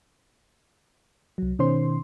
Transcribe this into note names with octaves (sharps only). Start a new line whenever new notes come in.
C2 F#3
B2 D#3 C#4 C5 C6